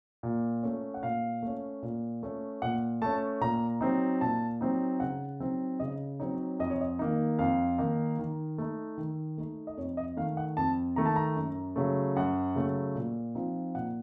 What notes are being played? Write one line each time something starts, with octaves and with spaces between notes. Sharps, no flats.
A#2
A3 C#4
F#5
A#2 F5
A3 C#4
A#2
A3 C#4
A#2 F#5
A3 C#4 A5
A#2 A#5
F#3 C4 D#4
A#2 A5
F#3 C4 D#4
C#3 F#5
F#3 C4 D#4
C#3 D#5
F#3 C4 D#4 C#5
F2 D#5
C#5
D#5
D#3 A#3 D#4
F2 F5
D#3 A#3 D#4
D#3
A3 D#4
D#3
A3 D#4
D#5
F2 C#5
D#5
D#3 A3 F5
F#5
F2 A5
D#3 A3 A#5
A5
A#5
F#2
C#3 F#3 A3
F#2 F#5
C#3 F#3 A3
A#2
F3 C4 D#4
A#2 F#5